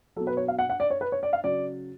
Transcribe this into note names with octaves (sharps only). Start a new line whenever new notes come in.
B2 F#3 A4
B4
C#5
F5
F#5
F#5
D5
C#5
B4
C#5
D5
F5
C#3 F#3 D5